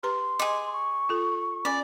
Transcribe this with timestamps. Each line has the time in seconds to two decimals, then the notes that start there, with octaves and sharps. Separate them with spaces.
0.03 G4 B4 A#5 C6
0.39 G#4 D#5 D6
0.73 C#6
1.09 F4 A4
1.65 C#4 D5 G#5